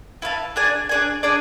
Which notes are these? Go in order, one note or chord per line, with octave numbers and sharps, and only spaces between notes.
E4 B4 F5 A5
D4 G#4 D5 G#5
D4 G#4 D5 G#5
D4 G#4 D5 G#5